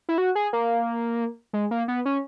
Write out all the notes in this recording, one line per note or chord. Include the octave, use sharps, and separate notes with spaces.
E4
F#4
G#4
A#3
G#3
A#3
B3
C#4